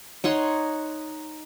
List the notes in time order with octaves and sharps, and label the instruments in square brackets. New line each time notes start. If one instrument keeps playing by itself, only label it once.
[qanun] D#4 C#5 F#5 C6